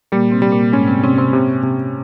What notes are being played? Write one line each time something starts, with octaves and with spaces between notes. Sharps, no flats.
A#2 G3 A#3
C3 C4
G3
A#2 A#3
G#2 G#3 C#4
C3 C4
C3 C4 C#4
C3 C4
C3
C3